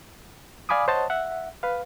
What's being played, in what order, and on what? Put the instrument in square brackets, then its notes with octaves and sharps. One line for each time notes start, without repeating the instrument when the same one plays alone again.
[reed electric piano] D5 F5 G#5 B5 D6 D#6
C5 C#5 D#5 F#5 A5
E5 F#5
B4 F5